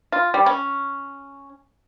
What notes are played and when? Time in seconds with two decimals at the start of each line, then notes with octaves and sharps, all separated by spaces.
0.12 F4
0.34 G3
0.46 C#4